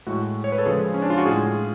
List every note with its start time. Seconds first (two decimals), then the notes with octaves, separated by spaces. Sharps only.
0.07 A2 G#3 F#4
0.44 C#5
0.52 B4
0.58 A4
0.66 C#3 F3 G#3 G#4
0.94 C#4
1.02 D4
1.10 F4
1.18 F#4
1.26 A2 G#3 G#4
1.46 F4